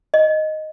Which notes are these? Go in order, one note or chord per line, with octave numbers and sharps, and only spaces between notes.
D#5